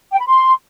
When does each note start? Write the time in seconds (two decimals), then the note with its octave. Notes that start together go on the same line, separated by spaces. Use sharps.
0.12 G5
0.19 B5
0.27 C6